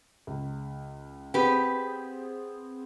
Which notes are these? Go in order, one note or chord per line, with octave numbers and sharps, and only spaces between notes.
C#2
B3 C4 G4 G#4 B4